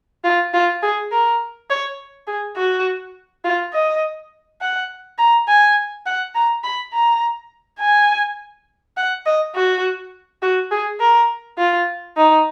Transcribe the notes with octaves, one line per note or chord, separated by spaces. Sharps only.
F4
F4
G#4
A#4
C#5
G#4
F#4
F4
D#5
F#5
A#5
G#5
F#5
A#5
B5
A#5
G#5
F#5
D#5
F#4
F#4
G#4
A#4
F4
D#4